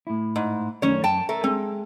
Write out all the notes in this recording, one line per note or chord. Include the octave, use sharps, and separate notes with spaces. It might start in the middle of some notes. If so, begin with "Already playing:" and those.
A2 E4
G#2
F#2 D#3 A3 C#4 C#5
F#2 G5 A5
A3 A#4
G#3 C4